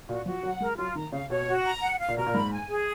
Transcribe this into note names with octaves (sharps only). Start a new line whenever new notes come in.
A#2 F#4
F3 F#4
F#3 F#5
G#3 A#4
F#3 F4
D#3 A#5
C#3 F5
B2 C#5
F#4
A#5
F#5
F5
A#2
B2 A#4
A#2
G#2 B5
G#5
G#4